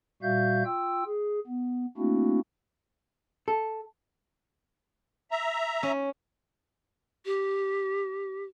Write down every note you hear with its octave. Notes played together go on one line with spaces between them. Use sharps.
A#2 G3 F#4 E5 F5 G6
F4 G5 E6
G#4
B3
A3 A#3 C4 D4 E4 F#4
A4
E5 A#5
C#4
G4